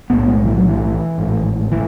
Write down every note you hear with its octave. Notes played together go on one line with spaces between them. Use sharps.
B1 A2 B3
G#3
E3
F#3
E3
A1 G#2
E3